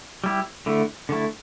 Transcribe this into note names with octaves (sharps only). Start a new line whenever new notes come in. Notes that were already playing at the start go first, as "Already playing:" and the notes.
G3 E4 G4
D3 A3 E4
D3 A3 E4